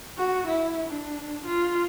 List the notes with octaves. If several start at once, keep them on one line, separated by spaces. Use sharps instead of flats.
F#4
E4
D4
F4